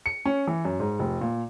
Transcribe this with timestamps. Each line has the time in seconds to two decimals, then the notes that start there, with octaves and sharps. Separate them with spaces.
0.06 C#7
0.26 C#4
0.47 E3
0.65 F#2
0.80 G#2
0.99 F1
1.21 A#2